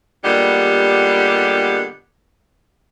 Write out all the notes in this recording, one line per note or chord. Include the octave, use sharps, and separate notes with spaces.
A#2 D3 G3 G#3 B3 G4